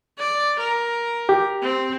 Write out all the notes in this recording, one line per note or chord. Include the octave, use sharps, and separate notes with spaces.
D5
A#4
G4
C4